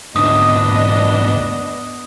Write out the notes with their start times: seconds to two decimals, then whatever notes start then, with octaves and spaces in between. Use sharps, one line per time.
0.16 D2 G#2 B3 D4 D#5 D#6